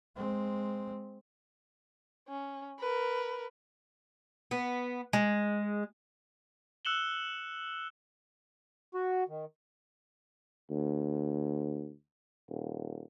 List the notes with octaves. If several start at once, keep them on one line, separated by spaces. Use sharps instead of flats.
G#3 C4
C#4
A#4 B4
B3
G#3
E6 F#6 C#7 E7 F#7 G7
F#4
D#3
D2
D#1